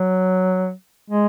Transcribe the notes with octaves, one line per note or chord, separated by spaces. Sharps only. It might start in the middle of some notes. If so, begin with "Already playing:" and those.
Already playing: F#3
G#3